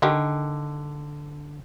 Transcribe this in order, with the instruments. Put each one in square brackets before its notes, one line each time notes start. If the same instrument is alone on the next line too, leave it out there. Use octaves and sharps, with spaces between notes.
[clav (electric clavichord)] D3 [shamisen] D#3 G4 A#4